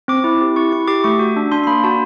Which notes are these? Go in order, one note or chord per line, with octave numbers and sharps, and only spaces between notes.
C4 D6
E4
G4
E4 C#6
E4 C#6
G4 D6
A3 C#6
F#4
D4
D4 C6
C6
A#3 B5
F#4 A5